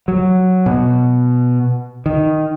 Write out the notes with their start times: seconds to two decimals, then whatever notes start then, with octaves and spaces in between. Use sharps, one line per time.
0.08 F#3
0.66 B2
2.06 D#3